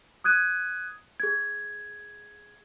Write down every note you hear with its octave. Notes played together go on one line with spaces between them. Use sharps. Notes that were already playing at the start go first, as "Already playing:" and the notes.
D#6 F#6 G#6 D#7
G#4 G#6